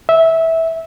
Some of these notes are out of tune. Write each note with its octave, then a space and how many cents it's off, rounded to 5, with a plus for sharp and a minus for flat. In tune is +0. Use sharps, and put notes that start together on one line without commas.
E5 -15